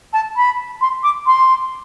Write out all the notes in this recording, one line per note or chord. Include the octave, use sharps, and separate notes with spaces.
A5
B5
C6
D6
C6